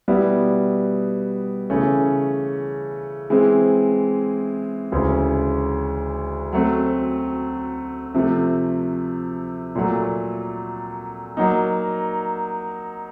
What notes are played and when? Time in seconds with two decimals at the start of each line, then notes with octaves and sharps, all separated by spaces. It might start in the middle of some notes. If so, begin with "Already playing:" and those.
0.08 B2 G3 B3 E4
1.70 C#3 E3 A3 C#4
3.30 E3 G#3 C4
4.92 D2 C#3 E3 G#3 C#4
6.53 F#3 A3 C4
8.14 C3 F3 A3
9.75 A#2 F#3 A3
11.37 F#3 A#3 D#4